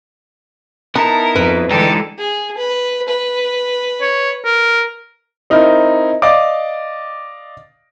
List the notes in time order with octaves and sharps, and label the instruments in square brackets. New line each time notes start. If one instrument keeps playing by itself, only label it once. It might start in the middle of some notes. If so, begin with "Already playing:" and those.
[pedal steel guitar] B3 D#4 E4 [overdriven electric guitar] A#4 [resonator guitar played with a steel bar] A5
[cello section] F2 [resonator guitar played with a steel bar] B4
[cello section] D3 E3 G#3 [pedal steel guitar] D#4 A4 [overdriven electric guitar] G4
[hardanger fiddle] G#4
B4
B4
[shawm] C#5
A#4
[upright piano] C4 D#4 E4 A#4
D5 D#5 F5 D6